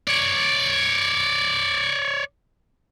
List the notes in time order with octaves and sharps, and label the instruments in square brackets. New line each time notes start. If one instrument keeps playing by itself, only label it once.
[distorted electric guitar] C#5 D5